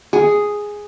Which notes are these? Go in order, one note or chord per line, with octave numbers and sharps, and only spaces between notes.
G#4